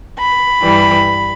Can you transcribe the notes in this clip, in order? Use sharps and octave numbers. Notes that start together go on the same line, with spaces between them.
B5
G2 E3 G3